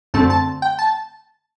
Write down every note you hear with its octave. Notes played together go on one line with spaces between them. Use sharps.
F#2 D3 A3 C4 A5
A5
G5
A5